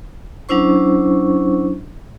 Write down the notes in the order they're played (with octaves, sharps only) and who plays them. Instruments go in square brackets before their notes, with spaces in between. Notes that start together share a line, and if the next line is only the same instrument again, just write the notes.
[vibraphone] F#3 C#4 D4 E4 C5 C#6